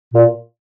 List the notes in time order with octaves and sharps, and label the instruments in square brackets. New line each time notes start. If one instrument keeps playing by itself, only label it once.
[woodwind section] A#2